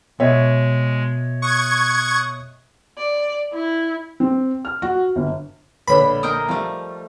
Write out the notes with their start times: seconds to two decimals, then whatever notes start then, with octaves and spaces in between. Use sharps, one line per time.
0.20 B2 G#3 C#5 D#5 E5
1.42 C#6 D#6 F#6 G#6
2.98 D5
3.53 E4
4.20 C4
4.65 F6
4.82 F#4
5.16 G1
5.87 A#1 D3 D4 B4 C#5 B5
6.23 A#4 D#5 G5 D#6
6.49 F3 G3 A3